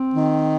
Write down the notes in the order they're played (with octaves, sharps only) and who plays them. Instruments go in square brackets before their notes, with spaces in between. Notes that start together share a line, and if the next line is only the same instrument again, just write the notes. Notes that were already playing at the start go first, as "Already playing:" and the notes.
Already playing: [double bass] C4
[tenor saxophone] D#3